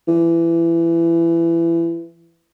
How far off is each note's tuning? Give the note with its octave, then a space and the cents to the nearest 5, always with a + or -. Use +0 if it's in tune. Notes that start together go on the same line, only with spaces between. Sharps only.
E3 +25